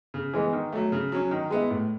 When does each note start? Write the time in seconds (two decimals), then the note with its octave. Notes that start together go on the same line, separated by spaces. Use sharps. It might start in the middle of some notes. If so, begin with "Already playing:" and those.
0.14 C#3
0.33 E3 G#3 B3
0.53 D#3
0.73 F#3 A3
0.92 C#3
1.12 F#3 C#4
1.31 D#3
1.50 G#3 B3 E4
1.70 A2